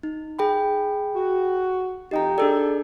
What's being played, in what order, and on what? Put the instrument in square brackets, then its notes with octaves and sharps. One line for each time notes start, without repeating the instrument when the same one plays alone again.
[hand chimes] D#4
G#4 G5 B5
[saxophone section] F#4
[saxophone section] F2 D#4 [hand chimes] G4 G5 A#5
[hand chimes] D4 G#4 D5 [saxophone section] A4